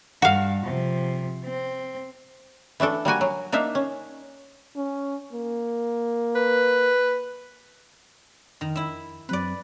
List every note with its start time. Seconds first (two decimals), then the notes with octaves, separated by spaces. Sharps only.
0.22 G2 F#4 F5
0.65 C3 F3
1.45 C4
2.80 E3 A3 D4 A4
3.05 G3 A#3 F#4 G#5
3.21 F#3
3.52 A#3 D4 D#4 E5 F5
3.75 C#4
4.76 C#4
5.33 A#3
6.35 B4
8.61 F2 D#3
8.76 E4 E5
9.29 F#2 F#3 C4 B4 D5